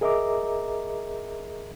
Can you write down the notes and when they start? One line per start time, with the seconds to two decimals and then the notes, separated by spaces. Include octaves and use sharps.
0.01 G#4 A#4 D#5 E5 A#5 D6